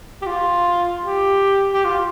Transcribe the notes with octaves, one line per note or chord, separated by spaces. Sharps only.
G4
F4
G4
G4
F4